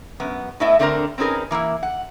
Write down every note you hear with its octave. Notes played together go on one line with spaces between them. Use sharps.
F#2 B3
A2 A3 B3 E4 D#5 E5
D3 A3 C4 D4 A4 A#4
C4 C#4 D#4 G#4 A#4 B4
E3 A#3 D#4 E4
F#5